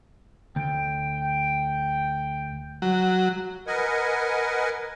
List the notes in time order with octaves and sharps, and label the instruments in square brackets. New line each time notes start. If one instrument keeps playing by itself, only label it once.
[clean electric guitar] D2 [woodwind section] G5
[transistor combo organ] F#3
[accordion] A#4 B4 D#5 F#5 G#5